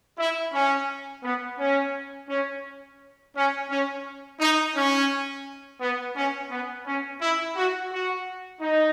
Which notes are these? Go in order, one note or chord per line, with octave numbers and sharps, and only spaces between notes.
E4
C#4
B3
C#4
C#4
C#4
C#4
D#4
C#4
B3
C#4
B3
C#4
E4
F#4
F#4
D#4